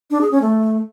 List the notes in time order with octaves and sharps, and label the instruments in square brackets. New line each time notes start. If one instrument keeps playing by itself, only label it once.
[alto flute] D4
G#4
C#4
A3